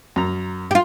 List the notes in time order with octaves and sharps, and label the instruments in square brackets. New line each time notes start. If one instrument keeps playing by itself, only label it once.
[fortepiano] F#2 A#5
[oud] F4 G4